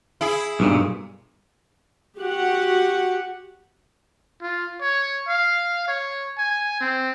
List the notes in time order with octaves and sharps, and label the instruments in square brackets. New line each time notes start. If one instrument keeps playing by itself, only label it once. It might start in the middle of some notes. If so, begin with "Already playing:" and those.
[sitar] E4 G#4
[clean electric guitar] B1 G2 A#2
[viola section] F#4 G4 F#5
[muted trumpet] F4
C#5
F5
C#5
G#5
C4